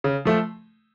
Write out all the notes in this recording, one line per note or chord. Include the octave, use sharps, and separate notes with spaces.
C#3
F3 A3